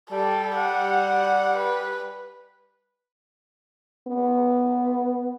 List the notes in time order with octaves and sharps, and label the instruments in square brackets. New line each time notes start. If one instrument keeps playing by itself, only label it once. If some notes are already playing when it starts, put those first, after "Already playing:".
[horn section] G3 [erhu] A4
[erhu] F#5
B4
[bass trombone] B3